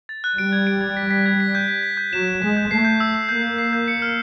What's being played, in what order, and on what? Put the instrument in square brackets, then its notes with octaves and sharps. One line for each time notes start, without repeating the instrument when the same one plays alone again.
[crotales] A6
F#6
[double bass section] G3 [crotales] D7
[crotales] G#6
D7
G#6
B6
B6
G#6
B6
G6
B6
B6
G6
[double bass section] F#3 [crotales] E7
[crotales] B6
[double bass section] G#3 [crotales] B6
[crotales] G6
[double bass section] A3 [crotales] C7
[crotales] G6
E6
E6
[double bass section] A#3 [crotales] G6
[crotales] C7
C7
G6
C#7
F6